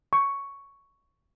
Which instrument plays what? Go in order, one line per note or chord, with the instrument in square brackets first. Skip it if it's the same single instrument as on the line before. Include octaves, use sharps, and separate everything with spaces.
[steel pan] C#6